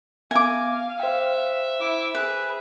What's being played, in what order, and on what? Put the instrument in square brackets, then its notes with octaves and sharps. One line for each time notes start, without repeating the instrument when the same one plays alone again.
[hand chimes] B3 E5 G#6 [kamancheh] F5 [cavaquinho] G#5 D6
[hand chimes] C5 G5 [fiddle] E5
[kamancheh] E4 D6
[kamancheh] G#4 [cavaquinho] B4